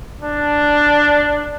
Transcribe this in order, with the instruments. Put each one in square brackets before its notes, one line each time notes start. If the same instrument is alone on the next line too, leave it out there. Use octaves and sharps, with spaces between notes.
[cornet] D4